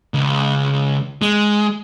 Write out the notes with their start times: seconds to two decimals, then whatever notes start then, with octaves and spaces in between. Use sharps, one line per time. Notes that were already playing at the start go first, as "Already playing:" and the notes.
0.14 C#2
1.22 G#3